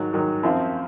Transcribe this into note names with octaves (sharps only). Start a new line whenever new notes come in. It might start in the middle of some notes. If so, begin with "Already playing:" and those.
Already playing: G#2 D#3 F#3
G#2 D#3 F#3
F#2 F3 C4 F4